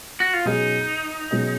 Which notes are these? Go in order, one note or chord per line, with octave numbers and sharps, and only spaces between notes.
F#4
F4
B2 F#3 C#4 D#4 G#4 D#5
B2 F#3 C#4 G#4 D#5